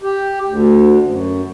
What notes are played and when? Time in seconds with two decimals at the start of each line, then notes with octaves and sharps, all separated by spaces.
0.02 G4
0.49 D2
1.05 F#2